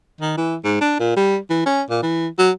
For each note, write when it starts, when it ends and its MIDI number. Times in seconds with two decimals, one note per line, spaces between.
0.21 0.34 51
0.37 0.57 52
0.64 0.80 44
0.81 0.96 62
1.00 1.13 46
1.17 1.38 55
1.50 1.65 52
1.66 1.83 61
1.90 2.03 46
2.03 2.27 52
2.39 2.51 54